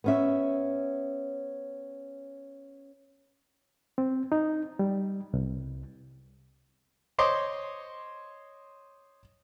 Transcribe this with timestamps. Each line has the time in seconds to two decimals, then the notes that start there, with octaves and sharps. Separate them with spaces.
0.04 B3 C#4 E5
3.98 C4
4.32 D#4
4.79 G3
5.34 C2
7.18 C5 C#5 D#5 C6 D6